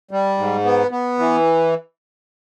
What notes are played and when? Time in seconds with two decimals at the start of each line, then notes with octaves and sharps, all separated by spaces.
0.11 G3
0.38 G#2
0.65 B3
0.91 B3
1.19 E3